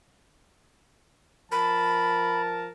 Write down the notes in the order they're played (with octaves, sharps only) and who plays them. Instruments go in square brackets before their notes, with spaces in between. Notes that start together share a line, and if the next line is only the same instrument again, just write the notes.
[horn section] F3 A#4 A5 [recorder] B5